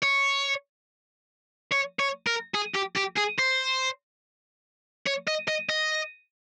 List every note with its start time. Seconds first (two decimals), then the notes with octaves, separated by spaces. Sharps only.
0.03 C#5
1.71 C#5
1.99 C#5
2.27 A#4
2.55 G#4
2.76 G4
2.97 G4
3.18 G#4
3.39 C5
5.07 C#5
5.28 D#5
5.48 D#5
5.69 D#5